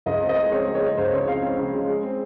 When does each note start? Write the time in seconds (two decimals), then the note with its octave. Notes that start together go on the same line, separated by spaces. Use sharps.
0.06 C#2 D#5
0.22 C4
0.29 D#5
0.37 G#3
0.52 C4 C#5
0.67 G#3
0.75 C#5
0.82 G#3
0.97 C#2 C5
1.12 C#3 C#5
1.28 C4 F5
1.43 C4 F5
1.59 C#3
1.73 G#3
1.88 G#3
2.03 C4